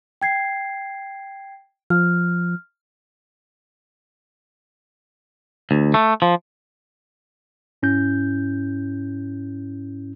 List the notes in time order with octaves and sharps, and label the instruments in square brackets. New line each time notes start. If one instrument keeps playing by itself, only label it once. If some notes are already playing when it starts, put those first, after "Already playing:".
[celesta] G5 G#6 C7
[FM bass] F3 [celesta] F6
[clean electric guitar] D2
A3
F3
[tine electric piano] G#2 C#4 E4 G6